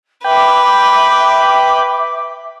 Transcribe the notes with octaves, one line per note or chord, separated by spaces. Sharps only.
B4 E5 G5 D6